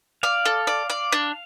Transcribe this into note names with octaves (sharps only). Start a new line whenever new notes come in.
D5 F5
A4
D5
D5
D4